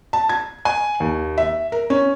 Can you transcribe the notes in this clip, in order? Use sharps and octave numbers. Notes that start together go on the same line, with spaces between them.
A5
G#6
G#5
D#2
E5
A#4
C#4